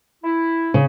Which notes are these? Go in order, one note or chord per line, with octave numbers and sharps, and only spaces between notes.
E4
C#3